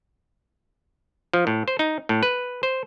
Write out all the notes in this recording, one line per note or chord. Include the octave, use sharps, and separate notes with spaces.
F3
A2
C5
D#4
A2
B4
C5